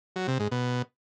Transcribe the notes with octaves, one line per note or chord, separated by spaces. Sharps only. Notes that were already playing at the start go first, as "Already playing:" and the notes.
F#3
C3
G#2
B2